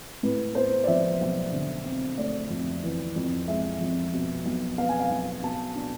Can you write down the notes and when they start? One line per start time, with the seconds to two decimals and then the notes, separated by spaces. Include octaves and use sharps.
0.23 A2 B4
0.55 B3 C5
0.84 D5
0.87 F3 E5
1.21 B1
1.53 D3
1.85 C4
2.17 A3 D5
2.50 F2
2.83 E3
3.16 F2
3.48 G#3 E5
3.81 F2
4.14 B2
4.45 B1
4.78 B3 F5
4.89 G#5
5.00 F5
5.10 B1
5.43 B2 A5
5.76 D4